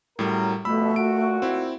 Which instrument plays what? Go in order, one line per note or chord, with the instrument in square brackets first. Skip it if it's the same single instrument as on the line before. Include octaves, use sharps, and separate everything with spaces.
[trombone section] F#2 A#4 [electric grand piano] A2 G3
[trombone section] F2 B2 [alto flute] A3 [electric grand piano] B5 E6
[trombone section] A#2 F#4 [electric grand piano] D7
[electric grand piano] C4 E4